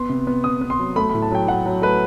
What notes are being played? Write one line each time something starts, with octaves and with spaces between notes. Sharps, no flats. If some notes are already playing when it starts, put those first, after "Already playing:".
Already playing: B3 C6
C3
B3
C3 D#6
B3
C6
F#3
A3 B5
B5
A2
A5
F#3 G5
F#3 F#5
F#3
A3 B4